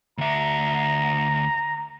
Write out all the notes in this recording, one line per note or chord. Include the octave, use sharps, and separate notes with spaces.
D2 E5 A#5